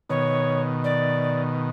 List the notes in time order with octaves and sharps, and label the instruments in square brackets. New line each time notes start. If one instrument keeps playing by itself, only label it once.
[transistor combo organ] B2 D#3 [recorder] C#5
[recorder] D5